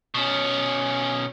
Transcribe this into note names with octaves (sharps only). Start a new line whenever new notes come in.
B2 C#4